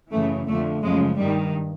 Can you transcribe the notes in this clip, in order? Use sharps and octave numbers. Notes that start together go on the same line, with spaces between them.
F#2 C#3 E3 A3
F2 D3 F3 A3
F#2 C#3 F3 G#3
G2 D#3 G3